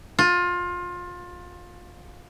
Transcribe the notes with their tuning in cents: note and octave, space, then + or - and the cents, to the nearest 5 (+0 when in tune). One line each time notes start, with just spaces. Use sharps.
F4 +25